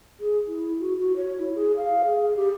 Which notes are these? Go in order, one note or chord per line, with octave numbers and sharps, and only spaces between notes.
G#4
E4
F#4
F#4
C#5
E4
G#4
F5
G#4
G4